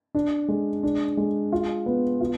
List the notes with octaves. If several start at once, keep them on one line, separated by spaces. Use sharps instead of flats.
D4
G#3
D4
G#3
F4
B3
F4